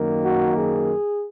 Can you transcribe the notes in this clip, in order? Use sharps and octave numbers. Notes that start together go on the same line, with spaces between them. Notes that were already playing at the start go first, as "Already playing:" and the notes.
Already playing: F#2 D#3 A#3
F#4
G#4